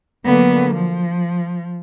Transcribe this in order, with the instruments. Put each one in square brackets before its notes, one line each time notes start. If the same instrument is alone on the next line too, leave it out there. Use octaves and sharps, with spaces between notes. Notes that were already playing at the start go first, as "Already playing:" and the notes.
[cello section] D3 F#3 A#3 [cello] B3
[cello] F3